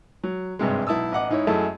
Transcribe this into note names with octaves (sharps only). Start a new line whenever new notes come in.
F#3
G#1 G2 C3 G#3
B1 E4 A5 D#6 E6
A1 D#5 F#5 D6
G#2 D#4 E4 C#5
F#2 A3 E4 G#4 D#5 A5